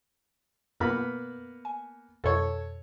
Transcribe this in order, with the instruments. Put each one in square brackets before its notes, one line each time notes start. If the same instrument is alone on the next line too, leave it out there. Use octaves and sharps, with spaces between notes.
[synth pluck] F#2 B2 [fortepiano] A#3 B3 B5
[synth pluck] G#5
[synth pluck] F2 B2 [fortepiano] A4 C#5